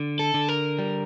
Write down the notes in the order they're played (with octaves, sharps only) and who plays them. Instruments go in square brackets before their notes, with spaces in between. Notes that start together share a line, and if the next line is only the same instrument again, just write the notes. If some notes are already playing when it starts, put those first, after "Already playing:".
Already playing: [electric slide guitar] D3
[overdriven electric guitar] A4
[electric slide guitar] D3
[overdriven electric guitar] A#4
[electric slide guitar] G3